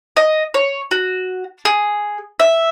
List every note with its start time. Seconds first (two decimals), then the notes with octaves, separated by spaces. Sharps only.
0.17 D#5
0.54 C#5
0.91 F#4
1.65 G#4
2.40 E5